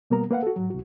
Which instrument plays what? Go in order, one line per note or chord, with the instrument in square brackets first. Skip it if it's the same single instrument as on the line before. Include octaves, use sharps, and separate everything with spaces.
[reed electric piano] B2 G3 A#3 B3 A#4 A#5
A#3 B4 F5 F#5
F#4 A4
G#2 F#3
C2 F#4